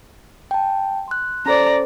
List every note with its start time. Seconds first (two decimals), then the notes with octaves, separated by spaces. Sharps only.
0.51 G5 A5
1.08 C6 F#6
1.46 C#4 A4 C5 D5 A#5